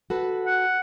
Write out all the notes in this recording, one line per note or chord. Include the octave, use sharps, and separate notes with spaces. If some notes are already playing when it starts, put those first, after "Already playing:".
F#4 A4 B4
F#5